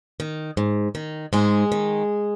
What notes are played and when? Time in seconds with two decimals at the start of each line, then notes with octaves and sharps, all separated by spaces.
0.20 D#3
0.57 G#2
0.95 D#3
1.33 G#2 G#3 G#4
1.72 D#3